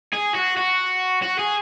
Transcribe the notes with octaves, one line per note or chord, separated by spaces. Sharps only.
G#4
F#4
F#4
F#4
G#4